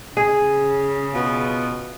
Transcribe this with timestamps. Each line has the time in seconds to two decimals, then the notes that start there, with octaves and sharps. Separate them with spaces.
0.17 C#3 G#4
1.14 B2 B3 F4